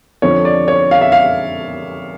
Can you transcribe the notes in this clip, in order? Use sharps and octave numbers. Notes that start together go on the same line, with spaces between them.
F2 D3 F3 C#5
D5
C#5
F5
E5
F5